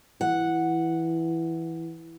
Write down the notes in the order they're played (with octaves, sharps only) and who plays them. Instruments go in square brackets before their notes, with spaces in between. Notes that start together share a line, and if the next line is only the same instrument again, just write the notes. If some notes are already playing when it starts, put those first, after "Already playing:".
[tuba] E3 [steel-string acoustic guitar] F#5